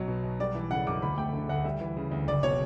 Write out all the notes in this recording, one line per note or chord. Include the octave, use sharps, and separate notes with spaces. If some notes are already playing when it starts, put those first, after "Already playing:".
Already playing: B1 F#3
B2
B1
G3 D5
E3
C#3 F#5
F#2 D6
D2 B5
A3 G5
D3
D2 F#5
G3 E5
E3
C#3
D2
F#1 D5
B2 C#5